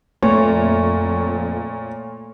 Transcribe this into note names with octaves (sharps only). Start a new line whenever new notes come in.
F2 A#2 A3 C#5